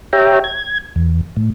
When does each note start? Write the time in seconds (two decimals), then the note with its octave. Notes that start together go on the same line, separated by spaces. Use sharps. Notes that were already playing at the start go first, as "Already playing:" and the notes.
0.13 G4 C#5 E5 G5 A#5
0.44 G#6
0.96 E2
1.37 A2